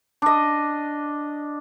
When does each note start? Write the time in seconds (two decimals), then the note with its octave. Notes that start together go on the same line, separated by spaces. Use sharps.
0.22 D4 D#5